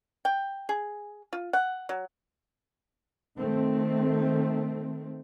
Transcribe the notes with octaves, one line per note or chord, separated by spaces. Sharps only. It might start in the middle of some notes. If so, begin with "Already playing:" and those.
G5
G#4
F4
F#5
F#3
D#3 A3 C4